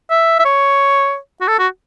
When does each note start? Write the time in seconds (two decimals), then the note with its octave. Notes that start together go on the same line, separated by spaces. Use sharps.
0.10 E5
0.39 E5
0.45 C#5
1.41 F#4
1.48 A4
1.59 F#4